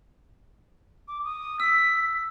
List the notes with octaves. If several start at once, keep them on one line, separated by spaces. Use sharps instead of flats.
D6
D#6
E6 B6